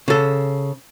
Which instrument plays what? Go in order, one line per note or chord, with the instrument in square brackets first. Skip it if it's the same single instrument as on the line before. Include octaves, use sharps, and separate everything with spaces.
[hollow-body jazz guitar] C#3 A4